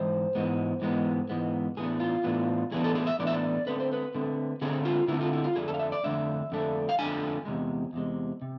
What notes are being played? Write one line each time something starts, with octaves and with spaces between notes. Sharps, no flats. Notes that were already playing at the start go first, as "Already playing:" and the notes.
Already playing: G#2 E3 C5
G#2 E3 G#3 B3
G#2 E3 G#3 B3
G#2 E3 G#3 B3
A2 E3 B3 D4 G#4
F4
A2 E3 B3 D4
A2 E3 B3 D4 G#4
A4
G#4
E5
A2 E3 B3 D4 D5
E5
D5
D3 A3 C4 B4
C5
B4
D3 A3 C4
D3 A3 C4 G#4
F4
D3 A3 C4 E4
F4
E4
F4
F2 D3 A3 D4 G#4
A4
F5
E5
D5
F2 D3 A3 D4 E5
F2 D3 A3 D4
F5
F2 D3 A3 D4 G#5
E2 C3 G#3
E2 C3 G#3
C3